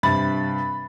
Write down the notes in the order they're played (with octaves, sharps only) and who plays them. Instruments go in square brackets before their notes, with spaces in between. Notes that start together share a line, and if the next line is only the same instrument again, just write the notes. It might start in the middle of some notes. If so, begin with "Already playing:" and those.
[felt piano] G2 C3 [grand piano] B5 A6